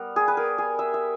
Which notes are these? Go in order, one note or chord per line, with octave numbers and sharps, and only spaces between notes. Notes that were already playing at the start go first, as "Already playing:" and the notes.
Already playing: G3 B3 A#4
G#4
B4
A#4
G#4
E5
E5